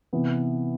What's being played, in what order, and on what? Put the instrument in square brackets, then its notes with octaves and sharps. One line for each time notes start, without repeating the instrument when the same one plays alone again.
[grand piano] C3 E3 B3